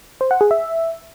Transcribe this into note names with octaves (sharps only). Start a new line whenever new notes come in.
C5
F#5
G#4
E5